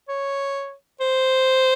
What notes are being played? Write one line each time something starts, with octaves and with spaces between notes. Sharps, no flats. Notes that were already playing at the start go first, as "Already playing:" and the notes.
C#5
C5